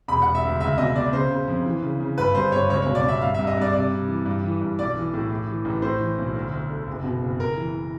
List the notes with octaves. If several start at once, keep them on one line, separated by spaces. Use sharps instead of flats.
E1 B5
E1 F#5
E5
D2
C#2 E5
B2 D#5
B2 D5
C#3 C5
C#3
F2
E3
C#3
C#3
G1 B4
G2 C5
G1 C#5
C#2 C#5
C#5
B2
D5
B2 E5
G2 F5
E5
G2
D#5
G2 D5
C3 D5
C3
E3
G2
E3
G2
B1 D5
E3
A2
A2
E3
A1
A2 C5
E3
B1
D2
D2
D3
F#1
B2
F#1
F#1 A#4
E3